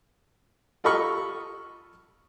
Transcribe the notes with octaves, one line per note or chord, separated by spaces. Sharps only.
F4 A4 D#5 B5 C#6 F6